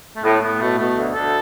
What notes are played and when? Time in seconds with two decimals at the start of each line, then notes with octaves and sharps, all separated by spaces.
0.16 A3
0.24 A2 B3
0.42 A2 B3
0.60 B2 A3
0.78 B2 A3
0.97 D2
1.14 D2 A4